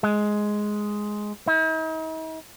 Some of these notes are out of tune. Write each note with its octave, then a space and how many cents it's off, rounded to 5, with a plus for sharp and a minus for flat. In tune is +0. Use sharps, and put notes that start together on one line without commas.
G#3 +5
D#4 +45